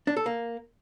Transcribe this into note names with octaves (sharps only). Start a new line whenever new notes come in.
D4
A4
A#3